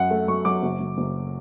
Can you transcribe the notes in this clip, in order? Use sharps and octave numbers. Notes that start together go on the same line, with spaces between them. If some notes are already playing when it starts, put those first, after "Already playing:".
Already playing: F#2 F#5
A3
F#3 C#6
F#3 D6
F#1
F#1
F#1